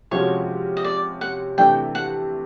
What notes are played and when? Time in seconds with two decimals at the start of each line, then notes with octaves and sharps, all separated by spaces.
0.11 C3 F3 G#3 C#4 F#4 C#5
0.77 D#5
0.84 D5
1.21 F#5
1.58 C3 E3 A3 D4 G5
1.95 F#5